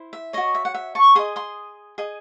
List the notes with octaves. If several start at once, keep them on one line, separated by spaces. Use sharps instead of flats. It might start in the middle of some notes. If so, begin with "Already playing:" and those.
Already playing: E4 C5
E5
F#4 C#5 D#5
E5
F#5
E5
A5 C#6
G#4 D#5 C6 D#6
C6 D#6
G#4 D#5